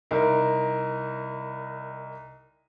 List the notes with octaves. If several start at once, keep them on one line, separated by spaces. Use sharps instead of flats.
C2 D#4 A#4